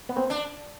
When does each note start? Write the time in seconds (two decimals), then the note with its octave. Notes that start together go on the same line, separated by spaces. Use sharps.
0.09 B3
0.17 C4
0.30 D4